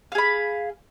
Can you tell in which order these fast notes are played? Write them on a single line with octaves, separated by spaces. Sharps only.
F5 G#4 B5